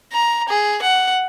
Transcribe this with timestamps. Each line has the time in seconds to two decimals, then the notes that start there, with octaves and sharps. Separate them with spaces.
0.13 A#5
0.49 G#4
0.82 F#5